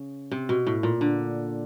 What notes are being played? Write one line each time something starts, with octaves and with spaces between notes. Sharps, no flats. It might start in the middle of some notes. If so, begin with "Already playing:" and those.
Already playing: C#3
C3
B2
A2
A#2
D3